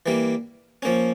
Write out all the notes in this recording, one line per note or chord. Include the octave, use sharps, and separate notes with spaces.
E3 G3 A#3
F3 A#3 C#4